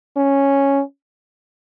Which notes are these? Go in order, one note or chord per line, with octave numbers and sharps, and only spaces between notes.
C#4